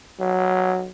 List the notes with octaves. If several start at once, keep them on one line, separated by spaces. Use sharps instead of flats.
F#3